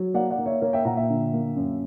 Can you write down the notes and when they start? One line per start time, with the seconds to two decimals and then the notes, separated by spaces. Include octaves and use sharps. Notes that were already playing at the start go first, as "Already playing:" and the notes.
Already playing: F#3
0.14 A#3 D5 F#5
0.30 D5 F#5
0.39 A#3
0.46 C#5 E5
0.61 A#3 A#4 C#5
0.73 E5 G5
0.85 A#2 F#5 A#5
0.97 E5 G5
1.09 D3
1.33 A#3
1.56 F#2